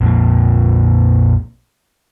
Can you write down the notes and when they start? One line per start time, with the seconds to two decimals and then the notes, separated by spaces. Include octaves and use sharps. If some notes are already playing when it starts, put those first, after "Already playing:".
0.01 A#1 F2 A#2